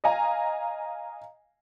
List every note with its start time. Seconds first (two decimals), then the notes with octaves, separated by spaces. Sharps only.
0.04 D#5 F5 G#5 A#5